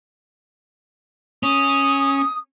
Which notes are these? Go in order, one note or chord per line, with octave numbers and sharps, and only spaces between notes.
C#4 D#6